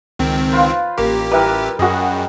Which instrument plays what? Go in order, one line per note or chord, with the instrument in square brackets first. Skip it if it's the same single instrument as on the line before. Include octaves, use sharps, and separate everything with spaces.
[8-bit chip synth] C#2 D#3 C4
[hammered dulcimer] F4 B4 C5
[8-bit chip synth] A1 G4 [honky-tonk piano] A#3
[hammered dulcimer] G3 A#4 [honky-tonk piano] E4 B4
[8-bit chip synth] F#2 [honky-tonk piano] F#4 G#4 [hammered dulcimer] D#5